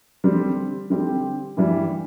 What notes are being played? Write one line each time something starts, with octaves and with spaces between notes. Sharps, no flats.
D3 G3 C4 G4
D3 G3 C4 G4
G2 E3 G3